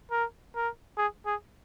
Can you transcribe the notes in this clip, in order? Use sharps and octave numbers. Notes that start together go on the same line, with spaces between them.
A#4
A#4
G#4
G#4